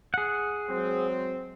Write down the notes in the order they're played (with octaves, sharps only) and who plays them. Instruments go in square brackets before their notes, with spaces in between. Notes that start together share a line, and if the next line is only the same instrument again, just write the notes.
[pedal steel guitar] G#4 F#5
[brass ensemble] F#3 G#3 C4